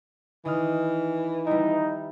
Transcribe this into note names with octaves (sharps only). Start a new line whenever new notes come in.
D#3 E3 D#5 F6
G3 B3 D#4 E4